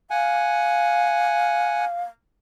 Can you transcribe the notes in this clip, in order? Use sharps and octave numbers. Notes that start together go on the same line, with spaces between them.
F5 F#5 G#5